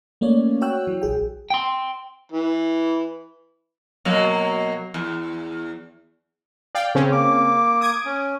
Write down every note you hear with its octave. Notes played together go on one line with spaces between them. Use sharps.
A3 A#3 C#4 C#5 D5
F#4 C#5 G5 E6 F#6
E3 F#3
A#1 G#4 G5
G5 C6
E3
B2 F#3 A#3
E2
D5 F5 G5
C#3 C4 C#4
A#3 D6
D#6 G#6 D7
C#4